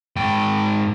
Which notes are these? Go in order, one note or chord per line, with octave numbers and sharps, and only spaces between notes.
G#2 G5